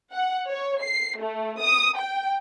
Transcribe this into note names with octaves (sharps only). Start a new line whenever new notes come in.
F#5
C#5
C7
A3
D#6
G5